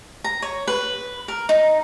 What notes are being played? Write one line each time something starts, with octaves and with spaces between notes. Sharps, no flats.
A#5
C#5
B4
A#4
D#4